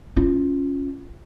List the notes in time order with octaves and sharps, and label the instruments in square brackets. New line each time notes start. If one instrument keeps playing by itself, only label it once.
[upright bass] C#4 F4